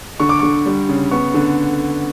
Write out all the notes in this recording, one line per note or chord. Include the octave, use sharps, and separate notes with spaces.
D3 C#6
D6
D3 C#6
G3
C#3
B3 C#6
D3